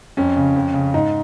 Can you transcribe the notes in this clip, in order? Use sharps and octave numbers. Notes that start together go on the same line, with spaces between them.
F2 C#4
C#3
F2
C#3
G#2 D#4